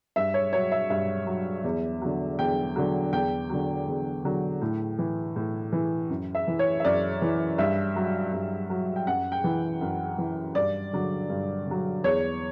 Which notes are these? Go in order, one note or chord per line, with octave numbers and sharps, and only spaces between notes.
G2 E5
C#5
F#3 C#5
E5
G2 E5
F#3
E2
D3 F#3
E2 G5
D3 F#3
E2 G5
D3 F#3
E2
D3 F#3
A2
E3
A2
E3
F#2
E5
E3
C#5
E5
F#2 D5
E3
G2 E5
F#3
G2
F#3
G5
F#2 F#5
G5
E3
F#2
E3
G2 D5
D3 F#3
G2
D3 F#3
E2 C#5